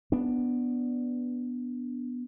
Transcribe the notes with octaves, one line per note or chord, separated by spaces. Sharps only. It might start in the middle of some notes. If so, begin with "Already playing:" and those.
B3 D4